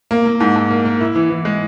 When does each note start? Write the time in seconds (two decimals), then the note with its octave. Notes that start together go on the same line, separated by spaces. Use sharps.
0.11 A#3
0.26 A#3
0.40 G#2
0.56 G#2
0.70 A#3
0.85 A#3
1.01 E4
1.16 E3
1.30 E3
1.45 G#3